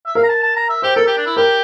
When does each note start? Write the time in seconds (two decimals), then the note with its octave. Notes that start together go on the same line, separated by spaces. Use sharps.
0.06 E5
0.15 A#4 F5
0.23 A#5
0.29 A5
0.43 A5
0.56 A#5
0.69 E5
0.82 G4 C5
0.96 A4 A#4
1.07 G4
1.17 D4
1.26 E4
1.36 G4 A#4